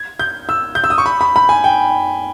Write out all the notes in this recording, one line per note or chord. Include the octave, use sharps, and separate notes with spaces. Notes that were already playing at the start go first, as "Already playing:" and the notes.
Already playing: G#6
G6
E6
G6
E6
D#6
C#6
B5
B5
B5
G#5
G5